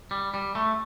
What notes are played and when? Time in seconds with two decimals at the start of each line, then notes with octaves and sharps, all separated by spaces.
0.11 G3
0.34 G3
0.55 A3